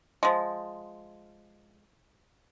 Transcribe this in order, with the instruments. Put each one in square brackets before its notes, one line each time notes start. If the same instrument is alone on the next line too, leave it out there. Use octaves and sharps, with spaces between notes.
[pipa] F3 G#3